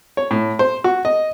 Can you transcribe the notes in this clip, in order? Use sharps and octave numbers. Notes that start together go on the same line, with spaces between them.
C#5
A2
C5
F#4
D#5